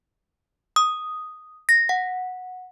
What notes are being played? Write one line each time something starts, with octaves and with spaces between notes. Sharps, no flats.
D#6
A#6
F#5